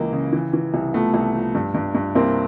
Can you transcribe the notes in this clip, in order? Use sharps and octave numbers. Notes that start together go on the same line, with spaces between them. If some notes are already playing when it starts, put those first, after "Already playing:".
Already playing: C#2 E3 A#3
C#3
E3
E3
C2
F3 A3 B3
C2
F3
G2
G2
G2
C2 A#3 C4